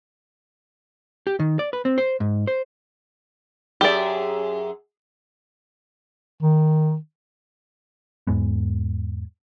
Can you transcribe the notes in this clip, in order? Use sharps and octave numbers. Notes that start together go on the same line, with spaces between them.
G4
D#3
D5
B4
C4
C5
G#2
C5
F#2 G4 G#4 D5 E5
D#3
E2 G#2 G#3 B3